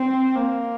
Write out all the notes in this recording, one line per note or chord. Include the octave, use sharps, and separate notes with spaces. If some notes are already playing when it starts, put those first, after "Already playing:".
Already playing: C4
A#3